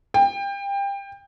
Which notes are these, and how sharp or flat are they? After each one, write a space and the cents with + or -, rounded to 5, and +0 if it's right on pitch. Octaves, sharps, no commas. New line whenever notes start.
G5 +25